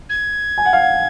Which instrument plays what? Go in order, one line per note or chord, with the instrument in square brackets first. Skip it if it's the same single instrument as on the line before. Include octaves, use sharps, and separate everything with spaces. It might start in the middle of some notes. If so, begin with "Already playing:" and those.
[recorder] G#6
[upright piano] G#5
F#5
F5
F#5